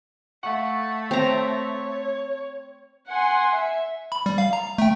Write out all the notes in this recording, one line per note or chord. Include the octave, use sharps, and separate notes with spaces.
A3 F5 F#5 C#6
C4 C#5 A#5
F#5 G#5 C6
E5
B5
G3
F5
A#5
A3 G5